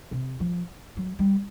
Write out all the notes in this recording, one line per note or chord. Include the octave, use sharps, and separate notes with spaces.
C3
F3
F#3
G3